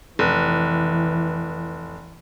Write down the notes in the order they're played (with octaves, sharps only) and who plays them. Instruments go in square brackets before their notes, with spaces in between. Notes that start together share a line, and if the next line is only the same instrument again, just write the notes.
[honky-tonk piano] F1 [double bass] E3